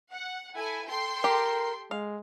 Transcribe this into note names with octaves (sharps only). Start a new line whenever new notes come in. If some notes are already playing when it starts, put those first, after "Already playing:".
F#5
E4 A4 G#5
A4 G5 C6
G4 A#4
G#3 F5